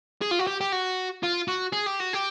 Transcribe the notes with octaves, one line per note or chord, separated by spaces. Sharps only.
G#4
F4
F#4
G4
G4
F#4
F4
F#4
G#4
G4
F#4
G4